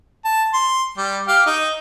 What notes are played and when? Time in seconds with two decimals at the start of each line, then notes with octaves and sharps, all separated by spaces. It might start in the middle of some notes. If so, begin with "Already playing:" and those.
0.25 A5
0.54 C6
0.97 G3
1.28 G4 F5
1.46 D#4